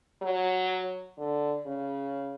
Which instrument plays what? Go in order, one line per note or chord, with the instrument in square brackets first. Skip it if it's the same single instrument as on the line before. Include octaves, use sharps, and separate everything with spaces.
[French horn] F#3
D3
C#3